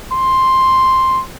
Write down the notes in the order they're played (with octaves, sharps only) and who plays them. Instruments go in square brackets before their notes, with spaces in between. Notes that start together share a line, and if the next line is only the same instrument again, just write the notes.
[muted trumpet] C6